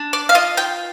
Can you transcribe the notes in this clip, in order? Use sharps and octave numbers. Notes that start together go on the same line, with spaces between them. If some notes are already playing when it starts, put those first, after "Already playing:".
Already playing: D4
D5
F5
F4 D#5
G5